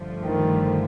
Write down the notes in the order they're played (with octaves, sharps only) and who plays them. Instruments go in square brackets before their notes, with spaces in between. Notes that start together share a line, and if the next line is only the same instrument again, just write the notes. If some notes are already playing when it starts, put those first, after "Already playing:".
Already playing: [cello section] G2 D3 F3 A3
[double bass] D#3